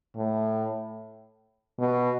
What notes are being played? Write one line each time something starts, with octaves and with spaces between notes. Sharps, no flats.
A2
B2